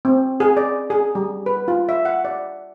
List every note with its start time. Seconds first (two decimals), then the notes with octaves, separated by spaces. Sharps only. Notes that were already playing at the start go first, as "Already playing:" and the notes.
0.05 C4
0.40 G#4
0.57 D5
0.90 G#4
1.15 G3
1.46 B4
1.68 F4
1.89 E5
2.05 F#5
2.25 D5